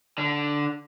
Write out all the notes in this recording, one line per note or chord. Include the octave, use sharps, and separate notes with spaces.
D3